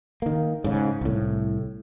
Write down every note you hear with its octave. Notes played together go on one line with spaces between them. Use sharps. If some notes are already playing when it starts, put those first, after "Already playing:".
D#3 A#3
G#2 C#3
C2 A2